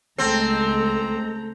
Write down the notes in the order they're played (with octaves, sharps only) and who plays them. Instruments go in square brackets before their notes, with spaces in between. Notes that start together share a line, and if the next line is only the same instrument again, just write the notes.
[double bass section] C#2 G#3 [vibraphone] A3 [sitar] C4 [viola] A4 A#5